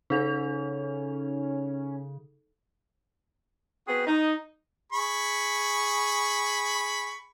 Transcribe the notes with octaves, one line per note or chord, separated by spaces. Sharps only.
C#3 C#4 D#4 A4 F7
B3 C4 F#4 G#4 B4 C5
D#4
G#4 B5 C#6